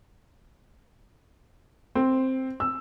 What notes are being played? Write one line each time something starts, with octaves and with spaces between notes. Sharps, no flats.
C4
E6